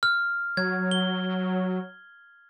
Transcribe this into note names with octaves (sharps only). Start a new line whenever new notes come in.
F6
F#3 G#6
G7